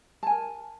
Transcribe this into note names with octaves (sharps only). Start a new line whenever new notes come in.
A#4 G#5 A5